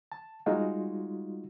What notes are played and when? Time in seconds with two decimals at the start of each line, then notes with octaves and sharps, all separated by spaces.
0.12 A5
0.46 G3 G#3 D#4 F4 F#4